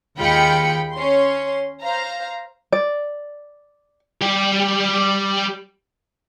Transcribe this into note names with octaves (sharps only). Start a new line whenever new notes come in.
D#2 G#3 F4 G5 B5 C#7
C#4 C6
C5 F5 A#5
D5
G3 G4